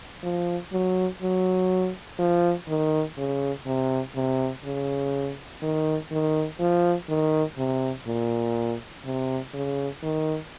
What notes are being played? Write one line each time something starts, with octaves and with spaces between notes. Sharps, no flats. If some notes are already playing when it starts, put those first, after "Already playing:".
F3
F#3
F#3
F3
D#3
C#3
C3
C3
C#3
D#3
D#3
F3
D#3
C3
A#2
C3
C#3
D#3